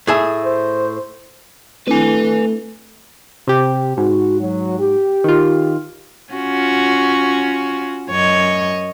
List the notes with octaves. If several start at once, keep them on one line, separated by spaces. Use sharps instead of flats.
A2 G#4 E5
C5
A3 C4 D4 E4 B4 G#5
C3 G4
G#2 F#4
F#3
G4
D#3 F4
C#4 F4 F#4
F#2 C#5 D#5